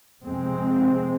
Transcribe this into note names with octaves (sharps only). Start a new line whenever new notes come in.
F2 C3 G#3 C4